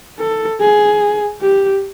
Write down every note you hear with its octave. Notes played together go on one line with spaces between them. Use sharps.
A4
G#4
G4